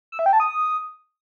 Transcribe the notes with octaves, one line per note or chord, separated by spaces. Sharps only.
E6
E5
G5
A5
D#6